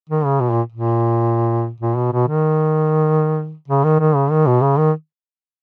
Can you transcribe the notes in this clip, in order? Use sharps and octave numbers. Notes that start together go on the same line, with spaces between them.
D#3
C#3
B2
A#2
A#2
A#2
B2
B2
D#3
C#3
D#3
D#3
C#3
D#3
B2
C#3
D#3